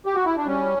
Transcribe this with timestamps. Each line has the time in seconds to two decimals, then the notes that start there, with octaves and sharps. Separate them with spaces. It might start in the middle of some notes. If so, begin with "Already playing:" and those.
0.06 G4
0.15 F#4
0.25 E4
0.37 D4
0.46 G3 C#4